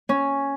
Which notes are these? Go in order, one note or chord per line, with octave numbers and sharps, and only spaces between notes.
C#4